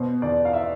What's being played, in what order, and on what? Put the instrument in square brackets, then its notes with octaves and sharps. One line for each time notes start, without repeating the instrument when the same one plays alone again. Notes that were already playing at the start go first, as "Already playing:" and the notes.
Already playing: [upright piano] B2 C5
E2 D5
F5
E5